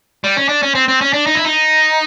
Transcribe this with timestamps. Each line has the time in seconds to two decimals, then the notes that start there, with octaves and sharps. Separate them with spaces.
0.24 G3
0.37 C#4
0.49 D4
0.63 C#4
0.75 C4
0.88 C4
1.01 C#4
1.13 D4
1.27 D#4
1.35 E4
1.45 D#4